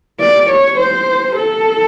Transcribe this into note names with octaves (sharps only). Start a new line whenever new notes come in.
D5
C#5
C5
A4